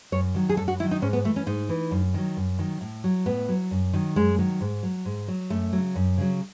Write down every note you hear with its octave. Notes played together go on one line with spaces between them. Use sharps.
F#2 C#5
D#3 F#3
G#4
F#2 A4
F#4
D#3 F#3 E4
D#4
G#2 C#4
B3
E3 A3
C#4
G#2 D#4
E3
F#2
D#3 F#3
F#2
D#3 F#3
A2
F#3
A2 B3
F#3
F#2
D#3 F#3
F#2 G#3
D#3 F#3
G#2
F#3
G#2
F#3
F#2 A3
C#3 F#3
F#2
C#3 F#3